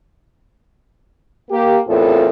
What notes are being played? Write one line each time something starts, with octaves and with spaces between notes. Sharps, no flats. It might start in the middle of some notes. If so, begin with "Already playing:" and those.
A#3 G4
E2 A2 C4 F4 A4 A#4